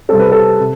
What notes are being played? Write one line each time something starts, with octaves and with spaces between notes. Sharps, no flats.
C3 G3 C4 A4
B4
A4
C3